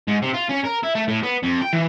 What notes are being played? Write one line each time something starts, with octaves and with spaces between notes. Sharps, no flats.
G#2
C3
F4
C#4
A#4
E4
A3
A2
B3
F2
G5
E3